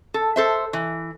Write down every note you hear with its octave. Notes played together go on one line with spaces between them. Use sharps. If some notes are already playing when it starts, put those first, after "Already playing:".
A4
A4 C5 E5
E3